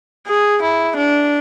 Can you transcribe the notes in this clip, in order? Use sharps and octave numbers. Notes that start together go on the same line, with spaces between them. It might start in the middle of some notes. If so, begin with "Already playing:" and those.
G#4
E4
D4